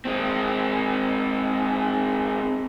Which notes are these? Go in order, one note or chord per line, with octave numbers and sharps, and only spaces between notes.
G#3 C4